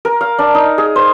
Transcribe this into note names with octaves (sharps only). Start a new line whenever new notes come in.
A#4
F5
D4
D#4
G#4
C5